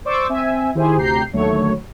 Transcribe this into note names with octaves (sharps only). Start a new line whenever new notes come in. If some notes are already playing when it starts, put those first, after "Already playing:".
C5 D5 C#6 D6 E6
C4 E5 G#5
D#3 E4 G4 G#4 C5 G#5
D2 C3 G4 A#5 G6 C7
D#2 D3 F#3 A3 C#5